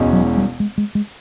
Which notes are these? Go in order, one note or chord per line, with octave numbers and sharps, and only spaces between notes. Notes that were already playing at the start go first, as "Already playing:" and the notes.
Already playing: E1 E2 B2 G#3 C#4
F#3
G3
G#3
G#3
G#3